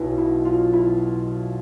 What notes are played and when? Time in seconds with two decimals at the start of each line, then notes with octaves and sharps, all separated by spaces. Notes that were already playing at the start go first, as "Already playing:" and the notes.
Already playing: B1 B2 E4
0.18 E4
0.45 F4
0.73 E4